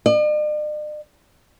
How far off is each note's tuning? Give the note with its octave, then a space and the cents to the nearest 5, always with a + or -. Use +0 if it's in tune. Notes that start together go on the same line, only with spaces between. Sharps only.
D5 +45